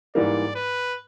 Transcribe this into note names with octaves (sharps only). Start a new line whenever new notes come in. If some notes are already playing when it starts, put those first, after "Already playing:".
G#2 E3 G3 A#3 D5
B4